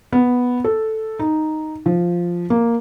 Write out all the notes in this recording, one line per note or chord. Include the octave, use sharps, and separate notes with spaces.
B3
A4
D#4
F3
A#3